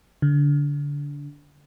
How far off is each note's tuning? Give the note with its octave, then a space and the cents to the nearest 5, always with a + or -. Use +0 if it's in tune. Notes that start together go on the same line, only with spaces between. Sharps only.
D3 -25